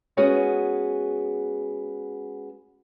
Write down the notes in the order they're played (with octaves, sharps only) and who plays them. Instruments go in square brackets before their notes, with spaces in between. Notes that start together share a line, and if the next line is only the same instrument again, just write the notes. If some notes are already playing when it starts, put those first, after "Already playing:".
[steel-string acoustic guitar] G#3 B3 C#4 F#4 G#4